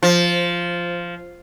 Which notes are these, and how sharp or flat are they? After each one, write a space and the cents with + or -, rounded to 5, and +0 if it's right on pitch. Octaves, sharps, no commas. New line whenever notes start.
F3 -5